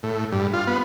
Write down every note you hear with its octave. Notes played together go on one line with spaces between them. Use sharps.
A2
G2
F4
B3